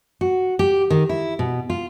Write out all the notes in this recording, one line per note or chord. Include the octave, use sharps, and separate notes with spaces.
F#4
G4
D#3
E4
B2
F4